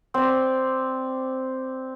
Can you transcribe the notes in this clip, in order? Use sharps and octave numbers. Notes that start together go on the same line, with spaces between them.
C4 D5